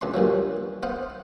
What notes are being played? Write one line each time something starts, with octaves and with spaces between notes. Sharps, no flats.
C#2 D4 C6
G2 A#2 F3 F#3
B3 C5 F5 F#5